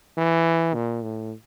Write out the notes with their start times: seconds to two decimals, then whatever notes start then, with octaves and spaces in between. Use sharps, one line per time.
0.17 E3
0.74 A#2
1.02 A2